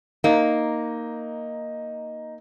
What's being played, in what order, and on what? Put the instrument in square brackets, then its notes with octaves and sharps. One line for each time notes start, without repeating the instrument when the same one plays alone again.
[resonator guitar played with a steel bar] A#3 [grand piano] D#4